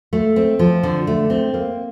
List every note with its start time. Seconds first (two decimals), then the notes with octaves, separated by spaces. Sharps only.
0.13 A3
0.36 C4
0.59 F3
0.83 D3
1.07 A3
1.30 C4
1.54 A#3